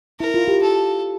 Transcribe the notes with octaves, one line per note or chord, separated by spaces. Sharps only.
E4 A#4
F4
G4
A4